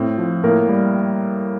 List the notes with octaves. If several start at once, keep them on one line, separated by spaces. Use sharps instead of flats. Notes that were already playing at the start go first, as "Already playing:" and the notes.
Already playing: A2 C4
F3
A2 A#3 A#4
G3